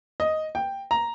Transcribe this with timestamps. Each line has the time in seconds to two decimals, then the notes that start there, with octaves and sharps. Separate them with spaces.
0.20 D#5
0.55 G5
0.91 A#5